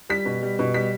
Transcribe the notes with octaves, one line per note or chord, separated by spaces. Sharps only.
G3 B6
B2
G3
B2
G3 B6